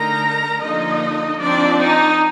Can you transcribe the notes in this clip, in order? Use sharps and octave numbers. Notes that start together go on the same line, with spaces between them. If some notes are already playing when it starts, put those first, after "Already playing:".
Already playing: D3 A3 D#4 A#4 A#5
D3 F3 A#3 D#4 D#5
F3 C4 D4 D#4 D5
D#4